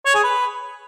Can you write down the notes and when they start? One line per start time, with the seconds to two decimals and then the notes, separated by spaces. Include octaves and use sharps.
0.06 C#5
0.15 G#4
0.24 B4